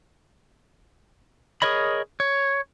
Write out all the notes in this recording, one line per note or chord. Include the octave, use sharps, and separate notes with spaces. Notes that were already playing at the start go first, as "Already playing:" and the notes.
G#4 A#4 C#5 D#5 B5
C#5